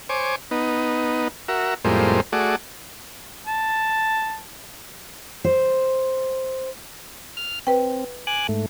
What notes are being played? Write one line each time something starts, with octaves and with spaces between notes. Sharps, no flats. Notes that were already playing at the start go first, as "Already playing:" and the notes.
C5 C#5 G#5 D6
B3 D#4
F#4 A#4 E5
F2 A2 G3 G#3 A#3 C5
A3 F#4 G#4 D5
A5
C5
F6
C4 B4 G5
G#5 D6 F#6
G#2 A3